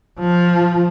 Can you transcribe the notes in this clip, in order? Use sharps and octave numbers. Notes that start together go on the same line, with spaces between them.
F3